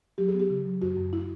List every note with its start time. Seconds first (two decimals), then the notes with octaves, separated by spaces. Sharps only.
0.18 F#3 G4
0.28 G#4
0.34 B3
0.40 G4
0.50 C#3
0.66 F#3
0.82 F#2 F#4
0.97 F#2
1.13 E4